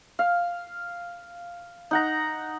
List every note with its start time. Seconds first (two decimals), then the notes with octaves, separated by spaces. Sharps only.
0.19 F5
1.91 D#4 F#5 A#5